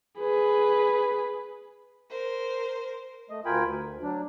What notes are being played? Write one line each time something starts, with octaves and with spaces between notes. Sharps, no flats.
G#4 B4
A#4 C5
A3 D#5
D2 F4 A#4 G5 G#5 B5
D2
F#3 D4